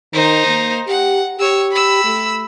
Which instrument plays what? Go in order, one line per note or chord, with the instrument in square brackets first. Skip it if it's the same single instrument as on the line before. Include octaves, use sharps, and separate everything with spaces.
[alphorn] D#3 [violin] D#4 C5
[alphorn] A#3
[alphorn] G4 [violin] F#5
[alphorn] G4 [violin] C#5 E6
[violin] B5 E6
[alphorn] A3